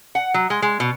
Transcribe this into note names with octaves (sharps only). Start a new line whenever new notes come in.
F#5
F#3
G#3
G#3
B2